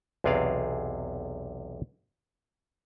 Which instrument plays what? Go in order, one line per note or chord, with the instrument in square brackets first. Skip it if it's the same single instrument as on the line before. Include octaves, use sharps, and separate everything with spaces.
[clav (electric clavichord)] B1 E2 C3 G#4 D5 F5